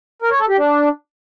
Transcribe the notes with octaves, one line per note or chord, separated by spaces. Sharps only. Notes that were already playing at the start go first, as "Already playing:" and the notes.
A#4
C#5
A4
G4
D4